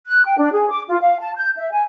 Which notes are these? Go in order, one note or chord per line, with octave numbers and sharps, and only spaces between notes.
F#6
G5
D4
G#4
D6
F4
F5
A5
G6
E5
G#5